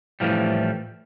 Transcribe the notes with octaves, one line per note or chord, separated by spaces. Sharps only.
A2 E3 F3 G3